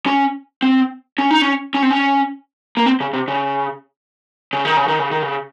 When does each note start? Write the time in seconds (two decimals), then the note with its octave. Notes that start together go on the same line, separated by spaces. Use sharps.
0.06 C#4
0.62 C4
1.18 C#4
1.31 D#4
1.42 C#4
1.74 C#4
1.82 C4
1.90 C#4
2.77 A#3
2.86 C4
3.00 C#3
3.13 C3
3.28 C#3
4.53 C#3
4.65 D#3
4.77 C#3
4.88 D#3
4.99 C#3
5.11 D#3
5.22 C#3